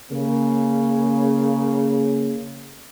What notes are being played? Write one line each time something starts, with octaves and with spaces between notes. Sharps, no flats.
C#3 A#3